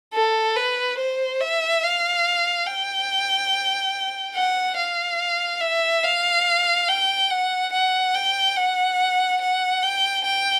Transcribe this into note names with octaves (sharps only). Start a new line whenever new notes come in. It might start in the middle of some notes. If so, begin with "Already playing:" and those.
A4
B4
C5
E5
F5
G5
F#5
F5
E5
F5
G5
F#5
F#5
G5
F#5
F#5
G5
G5